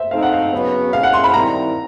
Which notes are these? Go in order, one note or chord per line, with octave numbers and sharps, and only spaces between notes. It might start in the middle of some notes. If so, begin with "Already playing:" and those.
Already playing: C5 E5
A3 C4 D#4 F5
F#5
F5
C#3 F#3 B3
G#3 C#4 E4 F5
F#5
C6
B5
D#3 G3 C4 E4 A#5